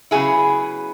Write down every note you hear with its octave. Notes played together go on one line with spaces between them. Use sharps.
C#3 F#3 B3 E4 G#4